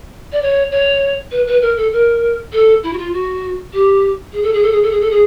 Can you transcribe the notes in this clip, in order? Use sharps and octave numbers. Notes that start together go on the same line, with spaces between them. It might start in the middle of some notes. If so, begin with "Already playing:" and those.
D5
C#5
C#5
B4
B4
A#4
A4
A#4
A4
E4
F#4
F4
F#4
G4
G#4
A4
G#4
A4
G#4
A4
G#4
A4
G#4